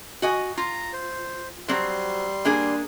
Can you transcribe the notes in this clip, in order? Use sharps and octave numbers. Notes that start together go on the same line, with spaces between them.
F#4 D#5 G#5
F4 A#5
C5
F#3 G3 C4 C6
A#3 D4 G#4